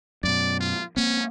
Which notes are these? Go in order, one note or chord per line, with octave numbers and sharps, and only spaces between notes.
F#2 B2 D5
F4
A#3 C4 C#4